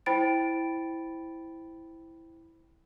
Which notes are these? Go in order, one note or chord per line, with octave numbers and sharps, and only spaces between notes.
E4 C5 G5 B5 A6 D7